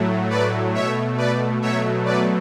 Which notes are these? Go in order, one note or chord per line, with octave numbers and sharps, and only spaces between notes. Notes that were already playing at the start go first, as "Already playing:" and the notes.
Already playing: A2 F#3 A3
B4 D5
B2 A3 C#5 E5
B4 D5
B2 F#3 A3 C#5 E5
B4 D5